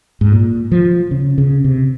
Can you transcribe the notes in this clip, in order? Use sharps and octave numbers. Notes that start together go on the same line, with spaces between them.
G#2
A#2
F3
C#3
C#3
C3